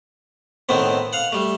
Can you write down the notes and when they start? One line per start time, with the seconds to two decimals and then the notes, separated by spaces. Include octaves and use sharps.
0.69 A2 D#3 A3 B3 C4
1.13 F5 F#5
1.32 G3 A3